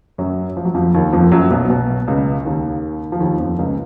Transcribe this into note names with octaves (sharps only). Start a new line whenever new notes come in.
F#2 F#3
F3
F#3
F2 F3
D#2 D#3
F2 F3
F#2 F#3
B1 B2
B1 B2
C#2 C#3
D#2 D#3
F3
D#2 D#3
F2 F3
C#2 C#3